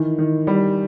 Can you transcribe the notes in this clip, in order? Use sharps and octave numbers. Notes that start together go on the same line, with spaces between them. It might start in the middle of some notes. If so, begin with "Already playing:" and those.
Already playing: D#3 E3
D#3
G3